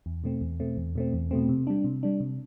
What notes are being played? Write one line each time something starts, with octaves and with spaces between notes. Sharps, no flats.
E2
B2 A3 C4
E2
B2 A3 C4
E2
B2 A3 C4
E2
B2 A3 C4
C3
G3 D4
C3
G3 D4
C3